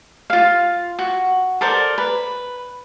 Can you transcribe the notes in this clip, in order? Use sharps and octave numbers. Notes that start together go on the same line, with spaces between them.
F4 F5
F#4
A4 A#4 C5 D5
B4